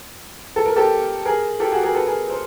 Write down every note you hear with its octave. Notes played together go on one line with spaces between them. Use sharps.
A4
A#4
G4 A4
G#4 A#4
G4 A4
F#4 G#4
G#4 A#4
A4 B4
G#4 A#4
A#4 C5